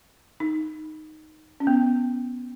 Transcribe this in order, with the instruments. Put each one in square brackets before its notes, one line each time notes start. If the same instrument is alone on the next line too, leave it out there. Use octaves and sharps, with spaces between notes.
[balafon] D#4
C#4
B3